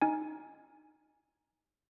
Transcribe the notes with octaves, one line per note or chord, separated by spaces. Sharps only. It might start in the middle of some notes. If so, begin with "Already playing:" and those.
D#4 G#5